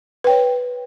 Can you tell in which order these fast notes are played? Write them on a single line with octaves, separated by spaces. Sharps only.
B4 G5 C#5